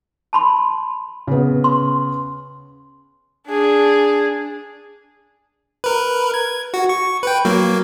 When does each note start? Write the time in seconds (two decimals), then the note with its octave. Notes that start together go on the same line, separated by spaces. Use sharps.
0.33 A5 B5 C6
1.27 C#3 B3
1.64 C6
3.48 D4 G#4
5.84 A#4 B4
6.34 G#6
6.74 F#4
6.89 C#6
7.23 B4 G5
7.45 F#3 A#3